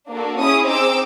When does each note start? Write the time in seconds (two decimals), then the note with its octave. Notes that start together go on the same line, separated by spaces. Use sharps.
0.12 A#3 D4 F#4 A4
0.39 C#4 E4 G#4 C#6 D#6
0.68 C4 D#4 G#4 D6 E6